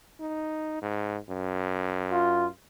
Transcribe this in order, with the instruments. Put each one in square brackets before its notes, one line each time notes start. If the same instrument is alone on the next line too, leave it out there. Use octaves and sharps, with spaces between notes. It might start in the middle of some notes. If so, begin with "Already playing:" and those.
[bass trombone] D#4
G#2
F#2
[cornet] F4